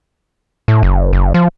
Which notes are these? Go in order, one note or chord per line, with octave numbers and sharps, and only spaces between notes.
A2
F#1
F#1
F3